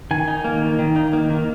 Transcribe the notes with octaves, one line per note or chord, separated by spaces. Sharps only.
D#3 G#5
D#4
A#3
D#3
D#3
D#4
A#3
D#3